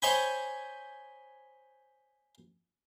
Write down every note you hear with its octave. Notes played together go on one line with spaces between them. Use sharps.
C5 C#5 D#5 G5 G#5 B5